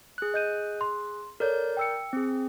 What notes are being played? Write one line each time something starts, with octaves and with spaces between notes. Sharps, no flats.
G#4 F#6
D#5 G6 D#7
C6
A4 A#4 C#5 D5 G6
G5 E6 C#7
C4 G#4